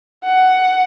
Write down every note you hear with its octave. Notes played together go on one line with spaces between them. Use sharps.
F#5